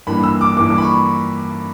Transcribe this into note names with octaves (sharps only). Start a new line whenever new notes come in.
G2 E3 A#3 B5
E6
D6
G2 E3 A#3 D6
D6
B5
C#6